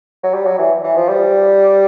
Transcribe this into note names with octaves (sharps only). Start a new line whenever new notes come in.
F#3
G3
F#3
E3
E3
F3
G3